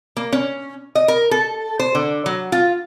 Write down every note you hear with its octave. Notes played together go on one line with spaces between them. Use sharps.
A#3
C#4
D#5
A#4
A4
C5
D3
F#3
F4